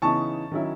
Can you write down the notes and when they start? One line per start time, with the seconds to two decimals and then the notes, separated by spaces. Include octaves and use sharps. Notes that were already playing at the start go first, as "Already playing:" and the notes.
0.02 C#3 E3 B3 D#4 A5 C#6
0.51 D#3 F#3 C#4 E4